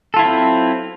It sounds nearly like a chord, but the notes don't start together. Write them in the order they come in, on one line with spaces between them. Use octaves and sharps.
A4 F4 E4 F#3 C4